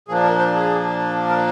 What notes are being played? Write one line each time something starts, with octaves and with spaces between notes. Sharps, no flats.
A#2 F3 A#3 D4 G#4
A#4
C5
G#4
A#4